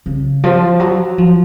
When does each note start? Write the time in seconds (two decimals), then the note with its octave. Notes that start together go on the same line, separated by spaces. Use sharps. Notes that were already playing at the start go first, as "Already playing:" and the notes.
0.06 C#3
0.44 F3
0.80 F#3
1.18 F3